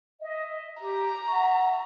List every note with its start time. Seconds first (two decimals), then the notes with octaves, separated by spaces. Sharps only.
0.20 D#5 E5
0.81 G4 A#5
1.28 E5 F#5 C#6